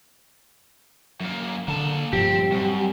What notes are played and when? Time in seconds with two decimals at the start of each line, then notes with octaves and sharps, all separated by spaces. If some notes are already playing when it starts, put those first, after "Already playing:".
1.20 F#2 A#3
1.68 D3 A#3 A5
2.13 G2 A#2 F3 C4 G4
2.52 F#2 G3 C4